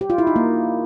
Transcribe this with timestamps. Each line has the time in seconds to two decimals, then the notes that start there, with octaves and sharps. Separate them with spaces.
0.01 G4
0.10 F4
0.18 E4
0.27 D#4
0.36 A#3